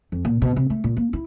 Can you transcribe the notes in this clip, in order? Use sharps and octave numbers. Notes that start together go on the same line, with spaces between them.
F2
A#2
B2
C3
A3
A#2
A#3
E4